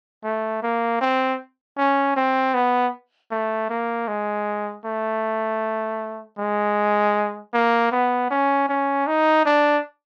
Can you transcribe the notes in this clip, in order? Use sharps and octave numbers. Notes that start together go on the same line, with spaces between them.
A3
A#3
C4
C#4
C4
B3
A3
A#3
G#3
A3
G#3
A#3
B3
C#4
C#4
D#4
D4